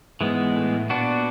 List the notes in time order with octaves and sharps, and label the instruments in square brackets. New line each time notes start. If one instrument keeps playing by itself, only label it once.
[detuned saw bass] G#2 [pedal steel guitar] E3 G#3 B3
[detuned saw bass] A2
[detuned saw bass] A#2 [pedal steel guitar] B3 D4 F#4